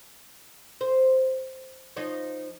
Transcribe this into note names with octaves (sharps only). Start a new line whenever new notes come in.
C5
F3 D#4 C#5